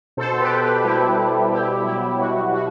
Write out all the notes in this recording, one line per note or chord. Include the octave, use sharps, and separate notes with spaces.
B2 A4 C5
G4 B4
B2
G4 B4
G3 E4 G4
G3
B2 E4 G4
F#3 E4 G4
B2 F#4
B2 F#4